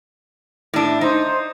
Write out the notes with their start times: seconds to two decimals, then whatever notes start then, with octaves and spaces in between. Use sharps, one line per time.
0.74 A2 D4
1.01 D#4 C5